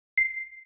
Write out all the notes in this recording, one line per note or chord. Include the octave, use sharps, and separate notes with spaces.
C7